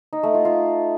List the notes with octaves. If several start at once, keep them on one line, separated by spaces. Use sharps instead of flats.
D#4
A3
F4
F4